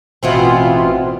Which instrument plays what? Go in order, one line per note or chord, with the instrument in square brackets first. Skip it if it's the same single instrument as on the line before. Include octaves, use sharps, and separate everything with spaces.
[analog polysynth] A1 B2 F4 [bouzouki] E3 B3 C4